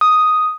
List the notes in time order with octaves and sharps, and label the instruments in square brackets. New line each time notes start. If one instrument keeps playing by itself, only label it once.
[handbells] D#6